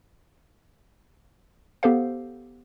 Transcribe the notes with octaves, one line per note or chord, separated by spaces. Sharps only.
B3 G4 A4 C5 F5